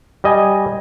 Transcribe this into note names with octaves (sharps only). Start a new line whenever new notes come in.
G3 D#5 G#5